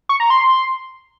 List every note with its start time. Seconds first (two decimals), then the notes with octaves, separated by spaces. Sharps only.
0.09 C#6
0.20 A#5
0.30 C6